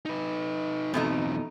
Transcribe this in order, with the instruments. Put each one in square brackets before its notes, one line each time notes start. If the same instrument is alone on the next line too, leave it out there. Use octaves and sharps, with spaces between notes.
[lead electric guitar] D#4 B4
[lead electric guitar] E2 C4 [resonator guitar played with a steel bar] B2 A3 D#4